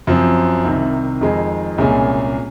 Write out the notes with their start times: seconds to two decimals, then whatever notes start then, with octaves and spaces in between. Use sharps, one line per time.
0.07 F#2 F3 C4
0.64 C2 C3 D#3
1.21 F2 D#3 G#3 D#4
1.78 C2 A#2 G#3 C#4 G#4